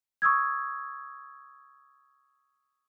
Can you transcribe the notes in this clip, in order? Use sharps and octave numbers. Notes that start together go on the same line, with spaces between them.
C#6 D#6 E6 G#6